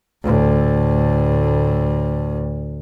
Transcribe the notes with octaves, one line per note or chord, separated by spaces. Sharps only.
D2 A2